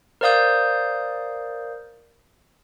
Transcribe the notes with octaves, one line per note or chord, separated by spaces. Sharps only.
A#4 C5 D5 F5 D#6 G6